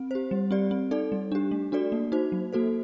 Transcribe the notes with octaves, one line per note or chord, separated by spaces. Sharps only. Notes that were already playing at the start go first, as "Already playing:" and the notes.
Already playing: C4
G4 C5
G3
C4 G4 D5
C4
D#4 A4 D5
G3
D4 G4
A3
D4 F#4 A4 D5
A#3
D#4 F#4 C5
F#3
A#3 F#4 A4 C5